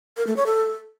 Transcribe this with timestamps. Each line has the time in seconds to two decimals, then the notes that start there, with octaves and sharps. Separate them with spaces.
0.17 A#4
0.27 A3
0.37 C#5
0.46 A4